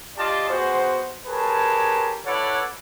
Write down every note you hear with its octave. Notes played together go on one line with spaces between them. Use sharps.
F4 G4 D5 D#5 A5 C6
B3 F#4 G#4 C5
G4 G#4 A#4 B4 C#5 A5
E4 A4 B4 C#5 D5 F#5